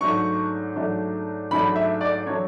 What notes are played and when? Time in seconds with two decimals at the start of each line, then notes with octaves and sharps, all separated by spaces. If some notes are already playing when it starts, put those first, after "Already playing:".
0.01 G#2 F#3 A3 D4 C#6
0.76 G#2 F#3 A3 D4
1.51 G#2 F#3 A3 D4 B5
1.76 E5
2.01 D5
2.26 F#3 A3 D4 C#5